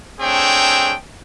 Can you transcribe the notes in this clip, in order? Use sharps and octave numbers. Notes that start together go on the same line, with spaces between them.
A3 C4 D4 G#4 C#5 G5